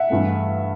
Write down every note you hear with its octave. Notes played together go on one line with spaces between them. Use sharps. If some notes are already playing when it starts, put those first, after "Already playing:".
Already playing: E5 F#5
G2 E3 A3